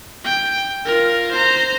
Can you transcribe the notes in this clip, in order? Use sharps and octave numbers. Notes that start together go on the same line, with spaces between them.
G5
F4 A#4
C5 A#5